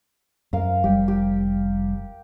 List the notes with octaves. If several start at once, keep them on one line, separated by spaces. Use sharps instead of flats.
F#2 A#4 F5
F1 G3 G4
G4